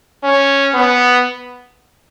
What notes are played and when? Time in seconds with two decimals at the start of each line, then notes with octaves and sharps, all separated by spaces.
0.23 C#4
0.74 B3